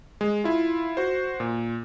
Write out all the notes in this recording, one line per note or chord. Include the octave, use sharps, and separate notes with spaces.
G#3
E4 F4
F#4 C5
A#2